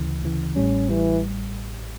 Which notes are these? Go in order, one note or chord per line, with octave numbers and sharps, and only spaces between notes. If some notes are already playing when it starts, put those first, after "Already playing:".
Already playing: D2 C#3 E3
D2 C#3 E3
A1 A2 G3 C#4
A1 A2 E3 G3